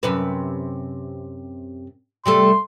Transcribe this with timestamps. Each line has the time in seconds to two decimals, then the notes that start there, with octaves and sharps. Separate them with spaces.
0.03 F#2 C3 B4
2.26 C3 G3 A3 C6